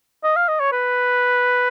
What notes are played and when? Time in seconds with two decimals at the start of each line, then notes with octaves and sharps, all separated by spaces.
0.24 D#5
0.36 F5
0.48 D#5
0.60 C#5
0.73 B4